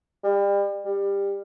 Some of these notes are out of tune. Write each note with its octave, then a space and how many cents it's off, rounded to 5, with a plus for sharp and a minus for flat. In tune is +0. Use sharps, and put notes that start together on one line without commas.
G3 +35
G3 +20